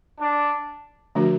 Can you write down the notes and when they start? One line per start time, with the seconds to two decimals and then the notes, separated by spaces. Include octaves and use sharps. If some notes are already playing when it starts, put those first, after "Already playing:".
0.20 D4
1.15 D3 F3 A3 D4 F#4